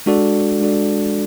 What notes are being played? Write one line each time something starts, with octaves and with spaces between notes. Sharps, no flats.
G#3 D4 F#4 A4 D5
G#3 D4 F#4 A4 D5